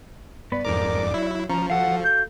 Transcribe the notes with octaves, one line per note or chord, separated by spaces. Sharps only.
G2 B3 B4 D5
F2 G#2 A#4 D6
F#3 E4
F3 C#4 A#5
F#4 A4 F5 F#5
G6